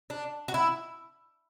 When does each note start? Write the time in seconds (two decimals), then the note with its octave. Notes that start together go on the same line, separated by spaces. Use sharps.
0.10 D4
0.48 F#4
0.54 E4